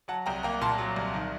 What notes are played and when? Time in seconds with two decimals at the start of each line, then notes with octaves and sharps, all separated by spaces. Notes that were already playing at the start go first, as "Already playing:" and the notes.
0.08 F#3 F#5 A5
0.26 C2 G5 A#5
0.43 A#3 G5 A#5
0.61 A#2 A5 C6
0.78 F#3
0.96 C2
1.14 D#3